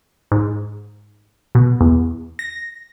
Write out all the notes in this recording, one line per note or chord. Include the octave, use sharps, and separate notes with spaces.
G#2
B2
E2
A#6